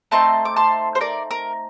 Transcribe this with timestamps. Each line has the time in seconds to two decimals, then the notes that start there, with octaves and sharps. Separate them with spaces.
0.11 A3 C4 D#4 A5 C6
0.45 D6
0.56 A5 C6
0.95 C5
1.01 A#4 D5
1.31 A#4